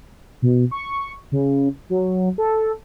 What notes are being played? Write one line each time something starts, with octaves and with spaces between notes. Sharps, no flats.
B2
C#6
C#3
F#3
A4